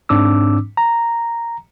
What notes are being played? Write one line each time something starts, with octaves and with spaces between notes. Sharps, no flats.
G#2 C4 D4 D6 E6
A#5